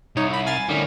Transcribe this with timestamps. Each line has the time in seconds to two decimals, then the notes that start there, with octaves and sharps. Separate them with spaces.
0.17 C2 D#4 C#5
0.30 E4 B5
0.46 F5 G#5 A6
0.69 A2 D3 D#3 G3 C#4